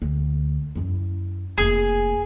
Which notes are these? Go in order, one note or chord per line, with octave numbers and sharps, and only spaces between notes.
D2
F#2 E4
F1 A#3 G#4